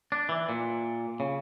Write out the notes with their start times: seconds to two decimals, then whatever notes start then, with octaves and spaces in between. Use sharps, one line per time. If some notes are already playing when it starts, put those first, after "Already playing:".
0.12 D4
0.29 E3
0.49 A#2
1.20 C#3